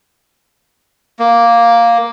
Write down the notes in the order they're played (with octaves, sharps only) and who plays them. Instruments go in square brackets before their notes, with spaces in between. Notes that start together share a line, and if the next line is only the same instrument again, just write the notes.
[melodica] A#3